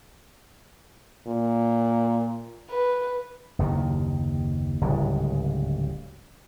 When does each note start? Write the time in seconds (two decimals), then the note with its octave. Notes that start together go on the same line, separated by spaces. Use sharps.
1.28 A#2
2.70 B4
3.59 F#1 D#2 C3 D#3
4.81 D1 C#2 G#2 G3